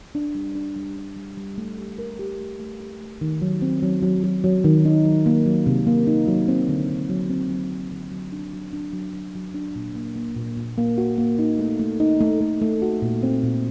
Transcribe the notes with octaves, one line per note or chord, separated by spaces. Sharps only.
D4
G3
D4
G3
D4
G3
G3
A3
G4
A#4
G4
A3
A3
G4
A3
D#3
F#3
C4
F#3
F#3
F#3
F#3
D#3
D#4
F#3
A#3
F#3
C3
A#3
D#4
F#3
C4
D3
D3
F#3
C4
F#3
C4
D3
F#3
D4
F#3
D4
F#3
F#3
F#3
D4
A#2
A#3
A#3
A#2
A#2
A#3
F#4
A#3
D#4
A3
A3
D#4
A3
A3
A3
F#4
A#2
C4
A#2